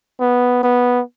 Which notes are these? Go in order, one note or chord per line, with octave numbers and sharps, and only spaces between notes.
B3
B3